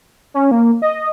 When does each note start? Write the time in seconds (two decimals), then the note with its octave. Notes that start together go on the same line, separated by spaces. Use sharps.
0.34 C#4
0.51 A#3
0.82 D#5